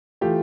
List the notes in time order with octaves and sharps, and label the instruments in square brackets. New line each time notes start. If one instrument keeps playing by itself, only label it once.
[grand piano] E3 A3 F4 G4